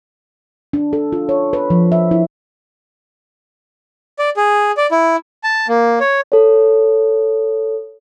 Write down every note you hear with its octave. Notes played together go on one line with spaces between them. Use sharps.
D4
A4
F4
C#5
B4
F3
E5
E4
D5
G#4
D5
E4
A5
A#3
C#5
A4 C#5